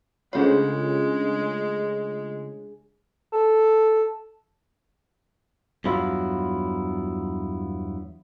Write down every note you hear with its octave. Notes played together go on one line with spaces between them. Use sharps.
C#3 G#3 A3 D4 F4 G#4 C#5
A4
E2 G2 F#3 B3 E4 F4